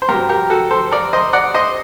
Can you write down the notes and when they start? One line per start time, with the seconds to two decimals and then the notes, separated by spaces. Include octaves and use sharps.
0.02 C5
0.09 G2 F#3 G4 A#4
0.29 G4 A#4
0.50 F#4 A4
0.71 A4 C5
0.91 A#4 D5
1.13 C5 D#5
1.33 D5 F#5
1.54 C5 D#5